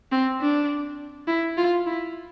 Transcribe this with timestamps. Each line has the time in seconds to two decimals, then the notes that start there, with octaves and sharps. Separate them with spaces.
0.12 C4
0.41 D4
1.27 E4
1.57 F4
1.87 E4